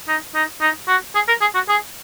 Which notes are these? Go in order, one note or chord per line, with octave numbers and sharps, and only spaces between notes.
D#4
D#4
D#4
F#4
G#4
A#4
G#4
F#4
G#4